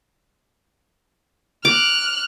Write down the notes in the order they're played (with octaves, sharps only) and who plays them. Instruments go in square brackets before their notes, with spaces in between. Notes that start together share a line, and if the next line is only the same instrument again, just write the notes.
[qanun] D6 [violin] F6 F#6